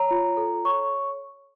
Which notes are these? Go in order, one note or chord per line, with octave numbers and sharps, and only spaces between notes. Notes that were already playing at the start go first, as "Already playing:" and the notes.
Already playing: C#5 A#5
F4
A4
C#5 C#6